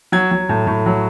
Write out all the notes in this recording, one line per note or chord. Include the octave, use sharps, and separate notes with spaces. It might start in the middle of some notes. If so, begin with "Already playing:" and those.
F#3 G#6
F#3
A2
A2
F#3